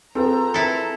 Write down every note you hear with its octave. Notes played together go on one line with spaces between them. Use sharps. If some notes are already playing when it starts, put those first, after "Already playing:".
F3 C4 G#4 A4 B4 A#5
E4 A4 A#4